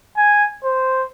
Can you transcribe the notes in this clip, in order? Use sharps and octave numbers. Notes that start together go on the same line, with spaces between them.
G#5
C5